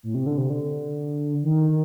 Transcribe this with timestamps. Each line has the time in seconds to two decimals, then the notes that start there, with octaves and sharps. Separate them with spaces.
0.03 A2
0.15 C3
0.26 D3
0.38 C3
0.50 D3
1.43 D#3